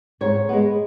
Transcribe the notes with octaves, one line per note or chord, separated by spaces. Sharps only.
G#2 C#5
G#3 B3